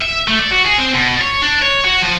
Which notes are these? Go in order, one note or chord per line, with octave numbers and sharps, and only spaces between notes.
E5
A3
D5
F#4
G#4
C4
B2
C#5
D4
C#5
F#4
F3